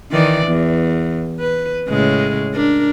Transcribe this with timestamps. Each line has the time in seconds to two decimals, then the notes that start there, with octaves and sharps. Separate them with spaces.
0.12 D#3 E3 D5
0.47 E2
1.40 B4
1.89 A2 C#3 G#3
2.54 D4 A#4